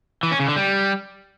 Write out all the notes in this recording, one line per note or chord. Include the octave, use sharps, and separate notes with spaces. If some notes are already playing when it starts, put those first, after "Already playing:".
E3
C#4
C#3
D3
G3